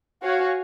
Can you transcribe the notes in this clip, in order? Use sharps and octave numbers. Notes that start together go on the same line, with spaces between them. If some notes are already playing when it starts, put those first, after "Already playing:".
F#4 C#5 F5 G#5